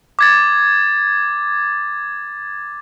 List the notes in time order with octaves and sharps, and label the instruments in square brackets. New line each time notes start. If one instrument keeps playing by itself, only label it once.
[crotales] D6 G#6 A6